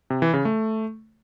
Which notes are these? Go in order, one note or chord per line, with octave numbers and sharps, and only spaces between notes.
C3
E3
C#3
A3